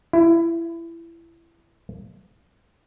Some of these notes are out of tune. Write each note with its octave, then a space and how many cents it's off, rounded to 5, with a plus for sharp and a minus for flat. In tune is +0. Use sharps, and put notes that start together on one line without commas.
E4 +20